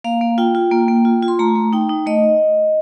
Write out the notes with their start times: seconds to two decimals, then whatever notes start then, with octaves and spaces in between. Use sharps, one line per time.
0.04 A#3 F5
0.21 A#3
0.38 F4 G5
0.55 F4
0.71 A#3
0.88 A#3
1.05 F4
1.23 F4
1.28 C6
1.39 A3 A#5
1.56 A3
1.73 D#4 G5
1.89 D#4
2.06 A3 D#5